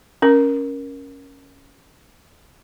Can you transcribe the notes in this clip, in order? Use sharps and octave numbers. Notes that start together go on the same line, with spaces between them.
C#4 A#4